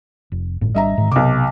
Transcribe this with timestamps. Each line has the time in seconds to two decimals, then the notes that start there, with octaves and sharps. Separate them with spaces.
0.32 F1
0.61 G1 A2
0.75 G#1 G3 D4 D#5 E5 A#5
0.98 G#2 D#3
1.12 B1 C3 D6